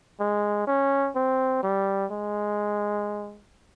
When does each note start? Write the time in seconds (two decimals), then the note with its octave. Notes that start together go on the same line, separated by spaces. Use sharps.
0.19 G#3
0.67 C#4
1.15 C4
1.63 G3
2.11 G#3